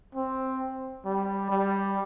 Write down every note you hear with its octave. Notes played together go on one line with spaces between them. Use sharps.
C4
G3
G3